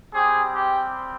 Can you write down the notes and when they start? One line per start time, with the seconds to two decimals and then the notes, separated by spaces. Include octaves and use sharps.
0.14 G3 C4 G4 G#4
0.55 G4